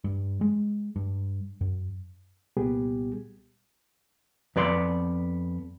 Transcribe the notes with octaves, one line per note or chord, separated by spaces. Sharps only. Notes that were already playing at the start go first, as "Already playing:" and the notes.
G2
G#3
G2
F#2
C2 A#2 G3 B3 G4 G#4
F2 B3 D5 C6